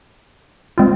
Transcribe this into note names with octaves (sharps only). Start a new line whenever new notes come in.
G#3 C4 F4